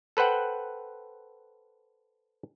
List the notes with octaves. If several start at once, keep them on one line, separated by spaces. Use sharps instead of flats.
A4 B4 C5 F#5 G5